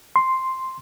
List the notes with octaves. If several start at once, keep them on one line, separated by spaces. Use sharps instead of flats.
C6